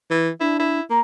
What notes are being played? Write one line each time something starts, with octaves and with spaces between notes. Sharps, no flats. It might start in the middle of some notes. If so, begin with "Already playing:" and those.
E3
D4 E4
E4
A#3 A#5